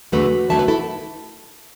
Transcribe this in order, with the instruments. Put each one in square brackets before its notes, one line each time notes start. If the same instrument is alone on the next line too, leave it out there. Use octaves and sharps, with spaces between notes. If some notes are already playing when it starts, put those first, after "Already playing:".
[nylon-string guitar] E2 D3 F#3 A3 F#4 B4
E2 D3 F#3 A3 E5 A5
F#4 B4
E4 A4